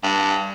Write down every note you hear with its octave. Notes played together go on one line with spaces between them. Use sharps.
G2